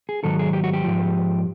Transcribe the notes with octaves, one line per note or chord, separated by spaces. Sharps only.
G#4
G#2 D#3 F#3 A4
G#4
G4
F#4
G4
G#2 F3